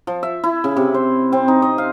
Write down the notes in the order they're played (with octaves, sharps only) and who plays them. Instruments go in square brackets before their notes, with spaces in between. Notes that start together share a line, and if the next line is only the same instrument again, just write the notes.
[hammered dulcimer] F3
E5
E4
C#3
C3
C5
C4
D#4
D#5
F5